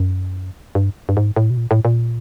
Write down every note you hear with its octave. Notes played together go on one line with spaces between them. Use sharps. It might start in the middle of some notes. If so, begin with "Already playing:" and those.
Already playing: F#2
G2
G2
G#2
A2
B2
A#2
A2
A#2